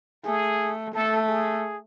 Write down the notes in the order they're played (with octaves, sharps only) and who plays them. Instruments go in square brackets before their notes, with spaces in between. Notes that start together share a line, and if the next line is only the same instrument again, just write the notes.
[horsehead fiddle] A3 [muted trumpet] G#4
[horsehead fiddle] A3 [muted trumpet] A4
[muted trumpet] G#4